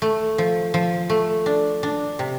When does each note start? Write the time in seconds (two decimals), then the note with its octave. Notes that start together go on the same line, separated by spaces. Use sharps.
0.02 A3
0.38 F3
0.74 F3
1.10 A3
1.46 D4
1.83 D4
2.19 C3